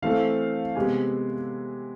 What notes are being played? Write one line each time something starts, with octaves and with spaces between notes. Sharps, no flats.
E3 A3 C4 F5
C3 G#3 B3 G#5